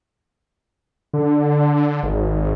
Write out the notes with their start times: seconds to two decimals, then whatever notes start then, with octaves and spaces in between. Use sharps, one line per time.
1.13 D3
2.03 G#1